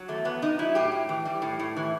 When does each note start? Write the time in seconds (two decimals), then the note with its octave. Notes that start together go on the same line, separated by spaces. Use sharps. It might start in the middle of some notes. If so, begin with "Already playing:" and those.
Already playing: F#3
0.08 E2 A3
0.25 E2 B3
0.42 C3 D#4
0.59 F#3 E4
0.75 A2 G4
0.92 A2
1.09 E3
1.26 G3
1.42 A2
1.59 A2
1.76 E3